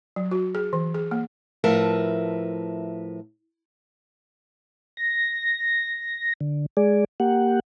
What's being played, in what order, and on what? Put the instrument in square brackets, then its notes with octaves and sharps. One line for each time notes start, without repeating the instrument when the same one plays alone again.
[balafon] F#3
F#4
G#4
E3
G#4
A#3
[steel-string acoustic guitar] A2 F3 A#4 B4 E5 A5
[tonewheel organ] A#6
D3
G#3 G#4 D5
A#3 G4 F#5